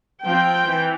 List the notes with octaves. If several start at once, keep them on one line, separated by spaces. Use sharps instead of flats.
F3 C4 G5
E3